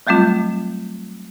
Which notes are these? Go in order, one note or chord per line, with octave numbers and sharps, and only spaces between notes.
F#3 G3 A3 C4 F4